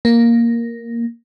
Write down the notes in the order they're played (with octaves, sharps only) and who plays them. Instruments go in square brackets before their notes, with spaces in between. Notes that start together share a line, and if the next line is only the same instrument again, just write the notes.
[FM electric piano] A#3